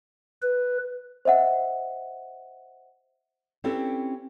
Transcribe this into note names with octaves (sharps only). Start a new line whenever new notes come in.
B4
C5 D#5 E5 F#5
C4 C#4 E4 G4 A4 B4